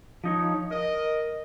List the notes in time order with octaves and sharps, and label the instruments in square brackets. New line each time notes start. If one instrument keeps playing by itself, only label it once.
[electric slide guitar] F3 D#4 C#5
[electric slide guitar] A#4 [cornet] D#5